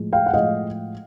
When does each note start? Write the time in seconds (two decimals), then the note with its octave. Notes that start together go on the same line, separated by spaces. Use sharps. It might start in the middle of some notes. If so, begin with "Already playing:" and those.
Already playing: A2 F3 G#3
0.13 F5 G5
0.26 F#5
0.34 A2 F3 G#3 D#5 F5